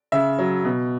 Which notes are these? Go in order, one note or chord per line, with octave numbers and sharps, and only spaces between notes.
C#3 E5
F#3
B2